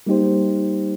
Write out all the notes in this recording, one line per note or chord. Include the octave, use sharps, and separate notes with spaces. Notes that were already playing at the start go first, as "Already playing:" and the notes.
G3 A#3 D#4 G4 C5